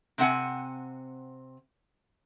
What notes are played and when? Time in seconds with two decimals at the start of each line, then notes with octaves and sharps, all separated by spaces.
0.18 C3 C4 F#5 G#5